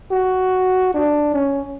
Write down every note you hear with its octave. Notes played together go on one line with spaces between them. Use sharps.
F#4
D4
C#4